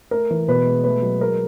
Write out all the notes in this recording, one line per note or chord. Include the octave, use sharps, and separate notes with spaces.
A3 A#4
E3
B2 B4
G#3
A3 B4
F#3
G#3 A#4